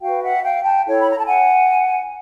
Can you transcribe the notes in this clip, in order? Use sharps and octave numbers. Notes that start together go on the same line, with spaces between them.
F#4 B4 F5 G5
E5 F#5
F5 G5
G5 A5
E4 A4 C#5
B5
A#5
A5
F#5 G#5